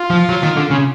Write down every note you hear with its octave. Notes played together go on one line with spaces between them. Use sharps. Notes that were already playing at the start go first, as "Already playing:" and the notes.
Already playing: F4
F3
F#3
D#3
D3
C#3